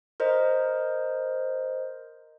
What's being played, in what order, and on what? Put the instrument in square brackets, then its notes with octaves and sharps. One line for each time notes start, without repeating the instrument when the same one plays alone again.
[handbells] A#4 C5 D#5